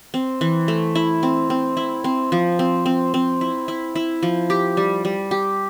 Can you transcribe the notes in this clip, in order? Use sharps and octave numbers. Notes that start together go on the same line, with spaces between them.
C4
E3
A3
E4
C4
C4
E4
C4
F3
C4
C4
C4
E4
E4
E4
F3
G4
G3
G3
G4